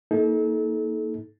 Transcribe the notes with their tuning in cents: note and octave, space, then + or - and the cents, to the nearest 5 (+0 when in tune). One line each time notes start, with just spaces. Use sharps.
A#3 +0 D#4 +35 A4 -35